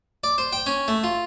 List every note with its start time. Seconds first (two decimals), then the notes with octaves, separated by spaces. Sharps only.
0.24 D5
0.38 C5
0.53 G5
0.67 C#4
0.88 A3
1.04 F4